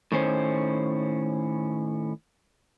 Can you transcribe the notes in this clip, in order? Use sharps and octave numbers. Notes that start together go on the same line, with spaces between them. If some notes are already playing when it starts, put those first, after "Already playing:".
A2 D#3 C#4 C5